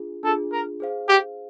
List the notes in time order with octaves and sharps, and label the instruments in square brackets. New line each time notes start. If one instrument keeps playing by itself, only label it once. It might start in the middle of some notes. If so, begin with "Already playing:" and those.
Already playing: [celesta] D4 F4 G#4
[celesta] D4 F4 G#4 [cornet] A4
[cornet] A#4
[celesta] G#4 C5 F5
[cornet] G4